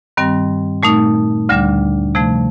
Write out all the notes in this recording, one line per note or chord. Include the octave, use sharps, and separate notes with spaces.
G2 D#3 G3 C4
A#2 A3 D#4
D2 D3 G3 D4
C3 F3 A3